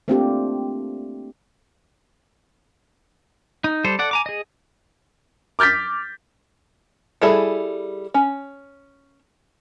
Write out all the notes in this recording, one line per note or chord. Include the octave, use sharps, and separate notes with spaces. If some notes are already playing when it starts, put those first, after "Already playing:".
A3 A#3 C4 D4 F4 G4
D#4
G3 A4 C5
A4 D5 F#5
G#5 A#5 D6
G#4 D#5
D6 F6 G6 A6 B6
G3 E4 G#4 A4 E5
C#4